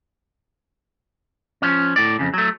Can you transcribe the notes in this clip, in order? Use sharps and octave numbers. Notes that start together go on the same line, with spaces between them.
F3 C#4
A2 D5
F2 C#3
F#3 A3